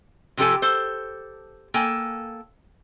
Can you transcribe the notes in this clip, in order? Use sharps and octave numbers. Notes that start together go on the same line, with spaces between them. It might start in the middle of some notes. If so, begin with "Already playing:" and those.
C3 F3 G4 A4 G#5
A4 C5
A#3 A4 G5 G#5